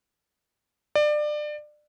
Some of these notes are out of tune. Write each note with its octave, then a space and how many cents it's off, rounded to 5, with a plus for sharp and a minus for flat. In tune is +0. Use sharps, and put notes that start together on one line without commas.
D5 +25